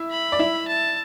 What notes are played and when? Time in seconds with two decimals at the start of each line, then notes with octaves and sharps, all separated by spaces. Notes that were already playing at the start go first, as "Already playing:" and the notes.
Already playing: E4 E5
0.11 B5
0.32 D5
0.39 E4 E5
0.67 A5